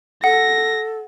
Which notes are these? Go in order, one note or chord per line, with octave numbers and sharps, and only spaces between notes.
A4 F#5 A#6